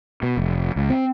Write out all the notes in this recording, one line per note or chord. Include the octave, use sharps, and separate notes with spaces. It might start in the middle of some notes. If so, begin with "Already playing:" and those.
B2
F1
C#2
C4